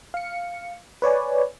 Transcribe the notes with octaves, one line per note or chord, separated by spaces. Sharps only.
F5 C#7
B4 C#5 D5 G#5